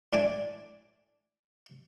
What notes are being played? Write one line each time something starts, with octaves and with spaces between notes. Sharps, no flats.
A2 D4 D5 G#5